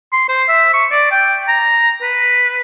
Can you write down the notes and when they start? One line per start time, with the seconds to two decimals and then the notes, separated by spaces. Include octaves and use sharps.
0.13 C6
0.29 C5
0.49 E5
0.74 C#6
0.92 D5
1.12 G5
1.49 A#5
2.02 B4